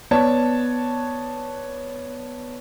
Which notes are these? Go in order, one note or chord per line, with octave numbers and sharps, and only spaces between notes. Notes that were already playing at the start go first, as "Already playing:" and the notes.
B3 C#5 D5 A5